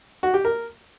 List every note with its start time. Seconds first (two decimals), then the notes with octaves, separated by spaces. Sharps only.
0.23 F#4
0.34 G4
0.45 A#4